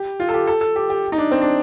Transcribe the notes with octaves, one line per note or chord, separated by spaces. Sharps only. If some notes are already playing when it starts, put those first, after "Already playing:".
Already playing: G4
F4
A4
G4
A4
A4
G4
G4
D#4
D4
C4
D4